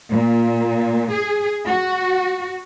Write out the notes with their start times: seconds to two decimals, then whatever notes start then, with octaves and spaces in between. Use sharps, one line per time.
0.11 A#2
1.13 G#4
1.66 F#4